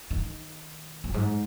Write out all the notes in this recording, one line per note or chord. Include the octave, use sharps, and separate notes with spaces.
D#3
F#2
G#2